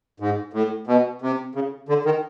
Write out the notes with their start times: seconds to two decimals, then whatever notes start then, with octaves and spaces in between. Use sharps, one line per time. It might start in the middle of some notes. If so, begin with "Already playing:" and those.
0.20 G#2
0.53 A2
0.87 B2
1.22 C3
1.55 C#3
1.89 D3
2.05 D#3